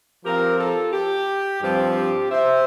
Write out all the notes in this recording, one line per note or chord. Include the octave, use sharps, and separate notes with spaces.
F3 C4 F4 G4 A#4
F4 A4
G4
G2 F3 C4 G4
C5 E5